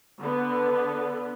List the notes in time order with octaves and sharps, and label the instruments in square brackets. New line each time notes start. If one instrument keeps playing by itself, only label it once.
[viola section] D3 B3